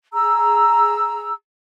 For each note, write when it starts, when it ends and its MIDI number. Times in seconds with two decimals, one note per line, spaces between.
0.13 1.33 68
0.13 1.33 82
0.13 1.33 88